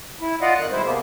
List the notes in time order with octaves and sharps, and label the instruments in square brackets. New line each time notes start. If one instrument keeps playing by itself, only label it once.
[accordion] E4
F4 D5 D#5 F5 F#5
F2 D#3 F#6
B2 G3 G#3 E4 C5
C3 G#3 A#3 B3